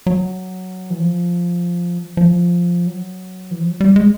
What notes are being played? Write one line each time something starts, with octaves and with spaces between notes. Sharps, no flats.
F#3
E3
F3
F3
F#3
E3
F3
F#3
G3
G#3